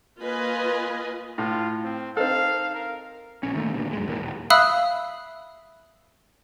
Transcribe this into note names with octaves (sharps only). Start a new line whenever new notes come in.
A#3 F4 B4 D#5 G#5
A2 F4
C4
C4 D#4 A4 F5
A#4
A#1 C#4
D#3 A3 A#3
D2 G2 A#2
F#2 G#3
D#1 E2 A#3
D#1
E5 F5 B5 D#6 E6 F#6